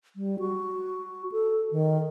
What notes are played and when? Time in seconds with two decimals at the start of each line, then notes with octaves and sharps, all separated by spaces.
0.16 G3
0.39 F#4
1.32 A4
1.71 D#3